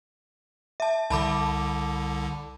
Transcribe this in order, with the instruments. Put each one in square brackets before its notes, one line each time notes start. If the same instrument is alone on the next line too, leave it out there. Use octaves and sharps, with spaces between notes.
[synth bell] E5 A5
[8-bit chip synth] C2 D3 [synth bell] A5 B5 D6